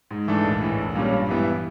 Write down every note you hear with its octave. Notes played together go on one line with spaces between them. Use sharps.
G#2
E3 A3 D4
A#1
A2 E3
A#1
A#2 G3 A#3 C#4
G2
E3 G3 B3 E4